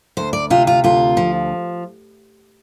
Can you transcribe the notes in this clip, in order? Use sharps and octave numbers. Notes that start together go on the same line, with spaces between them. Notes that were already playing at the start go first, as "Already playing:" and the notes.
D2 C5
D5
C3 F4
F4
D2 F4
F3